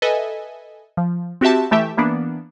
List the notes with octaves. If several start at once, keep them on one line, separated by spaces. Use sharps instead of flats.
A4 B4 D#5 E5 G#5
F3
C4 F#4 G4 E5 A5
E3 A3 G4 E5
E3 A#3 B3 D4